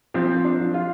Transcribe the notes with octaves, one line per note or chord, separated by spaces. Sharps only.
F3 C4
F3
D4
F3
F4